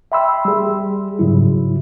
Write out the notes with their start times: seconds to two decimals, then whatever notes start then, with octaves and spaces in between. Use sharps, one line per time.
0.12 E5 G5 B5 C6 E6
0.45 G3 G#4
1.19 G#2 C#3 F#3 E4